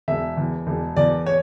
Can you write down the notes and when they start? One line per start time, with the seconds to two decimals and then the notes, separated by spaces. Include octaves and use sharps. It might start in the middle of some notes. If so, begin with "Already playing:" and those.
0.08 E1 E5
0.37 E2
0.67 E1
0.97 E2 D5
1.26 C#5